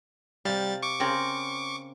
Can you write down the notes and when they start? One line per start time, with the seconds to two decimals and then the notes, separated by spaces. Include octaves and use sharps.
0.45 C3 G3 F5 A6
0.83 C#6 D6
1.00 C#3 C4 A#4